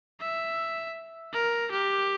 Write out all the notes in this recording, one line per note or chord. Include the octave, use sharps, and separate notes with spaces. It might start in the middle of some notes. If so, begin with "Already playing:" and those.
E5
A#4
G4